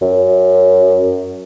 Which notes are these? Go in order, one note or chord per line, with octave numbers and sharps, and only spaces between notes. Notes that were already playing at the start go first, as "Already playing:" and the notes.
F#2